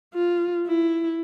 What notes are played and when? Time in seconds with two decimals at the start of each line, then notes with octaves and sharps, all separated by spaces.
0.14 F4
0.67 E4